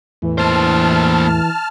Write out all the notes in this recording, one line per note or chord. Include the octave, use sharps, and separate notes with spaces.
E2 A2 E3
A#3 C5 A5 F6